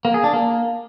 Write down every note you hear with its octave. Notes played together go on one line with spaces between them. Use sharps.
A#3
G#4
D4
A#3